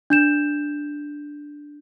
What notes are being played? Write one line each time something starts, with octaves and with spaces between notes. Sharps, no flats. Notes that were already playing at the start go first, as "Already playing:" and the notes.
D4 G6 E7